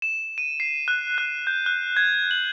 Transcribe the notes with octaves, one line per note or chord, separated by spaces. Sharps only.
E7
D#7
C7
F#6
F#6
G6
F#6
G#6
F#7